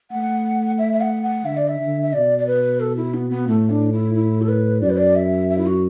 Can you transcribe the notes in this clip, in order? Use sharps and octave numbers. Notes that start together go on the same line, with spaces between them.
A3 F#5
E5
E5
F#5
F#5
D3 E5
D5
E5
D3
E5
B2 D5
D5
B4
A4
E4
B3
B3
A2 A3
D4
E4
E4
A4
B4
F#2 D5
B4
D5
E5
E5
E4
F#4